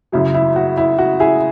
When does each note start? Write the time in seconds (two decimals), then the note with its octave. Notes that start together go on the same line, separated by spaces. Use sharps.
0.12 F#2 C#3 F#3 E4
0.34 E4
0.56 F#4
0.77 E4
0.99 F#4
1.20 E4 G#4